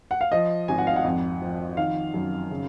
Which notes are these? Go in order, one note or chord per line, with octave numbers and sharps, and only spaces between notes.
F#5
F5
F3 D#5
G#1 G#5
F#5
F5
F#5
F2
F3
D#3 F5
F#2
C#3